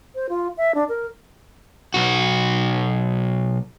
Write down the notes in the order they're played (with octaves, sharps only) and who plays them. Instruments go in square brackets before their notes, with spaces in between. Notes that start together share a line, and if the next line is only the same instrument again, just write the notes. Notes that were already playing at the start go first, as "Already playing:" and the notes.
[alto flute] C5
F4
E5
D4
A#4
[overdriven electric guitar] B1 F#4